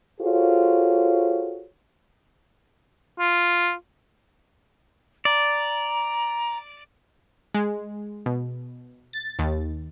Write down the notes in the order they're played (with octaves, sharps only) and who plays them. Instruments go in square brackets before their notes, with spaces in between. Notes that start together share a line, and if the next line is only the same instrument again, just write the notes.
[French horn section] F4 F#4 G#4 A4 C5 C#5
[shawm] F4
[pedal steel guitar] D5 [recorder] A#5
[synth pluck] G#3
B2
A6
D#2